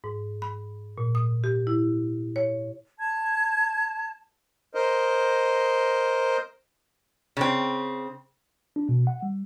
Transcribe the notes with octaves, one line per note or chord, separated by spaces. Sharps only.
G#2
B5
A#2
D#6
G4
E4
C#5
A5 G#6
A#4 C5 D#5
C#3 C4
D4
B2
F#5
G3